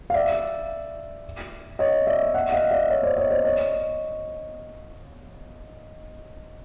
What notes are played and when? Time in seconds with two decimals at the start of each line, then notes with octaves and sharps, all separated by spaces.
0.10 F5
0.14 D5 E5
1.79 C#5 D#5
2.07 D5 E5
2.34 E5 F#5
2.52 D#5 F5
2.71 D5 E5
2.90 C#5 D#5
3.03 C5 D5
3.17 C#5 D#5
3.30 C5 D5
3.44 C#5 D#5